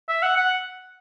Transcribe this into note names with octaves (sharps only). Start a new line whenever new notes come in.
E5
F#5
F#5